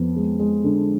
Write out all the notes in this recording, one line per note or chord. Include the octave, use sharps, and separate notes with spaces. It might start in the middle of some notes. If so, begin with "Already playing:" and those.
Already playing: F2 B3
G#3
G#3
D3